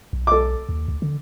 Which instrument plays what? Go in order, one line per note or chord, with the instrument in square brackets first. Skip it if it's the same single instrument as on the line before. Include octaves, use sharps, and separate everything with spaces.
[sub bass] B1
[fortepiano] A4 D6
[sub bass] D#2
D2
D3